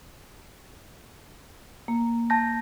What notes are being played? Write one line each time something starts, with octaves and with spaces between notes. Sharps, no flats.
A#3
A5 G6 A#6